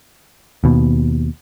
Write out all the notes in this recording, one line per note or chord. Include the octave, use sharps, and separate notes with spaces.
D#2 B2